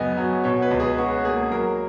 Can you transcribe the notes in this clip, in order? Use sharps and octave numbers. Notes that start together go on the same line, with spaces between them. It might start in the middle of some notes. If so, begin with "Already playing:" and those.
Already playing: F#2 C#3 B3 D#5 G#5
F#3
B2 C#5
B4
C#2
G#4
C#4 F#4
A#3 G#4
F#3 A#4